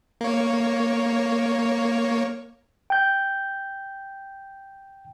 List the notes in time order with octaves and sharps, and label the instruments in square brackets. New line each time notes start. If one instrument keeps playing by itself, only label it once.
[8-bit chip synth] A#3 C#5
[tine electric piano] G5 G6